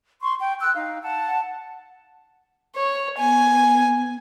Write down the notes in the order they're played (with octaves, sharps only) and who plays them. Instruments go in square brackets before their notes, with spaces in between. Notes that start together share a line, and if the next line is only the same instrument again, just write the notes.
[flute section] C6 C#6
G5
E6 F#6
D#4 F5
F#5 A5
[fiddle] C#5
[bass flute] B3 [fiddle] G#5